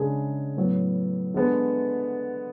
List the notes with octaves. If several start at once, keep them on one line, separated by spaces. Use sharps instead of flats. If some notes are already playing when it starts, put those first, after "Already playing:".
Already playing: C#3 G#3 D4 G#4
A2 F#3 B3
D3 G#3 B3